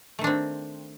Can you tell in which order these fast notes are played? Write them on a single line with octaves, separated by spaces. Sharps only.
A3 D#3 D4 C4